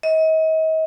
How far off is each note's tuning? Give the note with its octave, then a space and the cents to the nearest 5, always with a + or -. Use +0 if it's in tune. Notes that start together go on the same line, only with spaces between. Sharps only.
D#5 +40